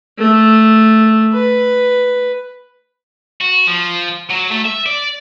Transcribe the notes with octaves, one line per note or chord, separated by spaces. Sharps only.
A3
B4
F#4
F3
F#3
A3
E5
D5